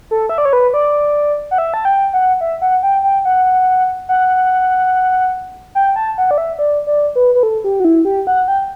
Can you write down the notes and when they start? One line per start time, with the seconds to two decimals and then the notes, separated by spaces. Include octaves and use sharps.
0.11 A4
0.29 E5
0.38 D5
0.45 C#5
0.53 B4
0.74 D5
1.51 F#5
1.58 E5
1.74 A5
1.85 G5
2.13 F#5
2.41 E5
2.62 F#5
2.83 G5
3.04 G5
3.25 F#5
4.09 F#5
5.75 G5
5.96 A5
6.18 F#5
6.31 D5
6.38 E5
6.59 D5
6.87 D5
7.16 B4
7.35 B4
7.43 A4
7.64 G4
7.80 F#4
7.85 E4
8.05 G4
8.27 F#5
8.48 G5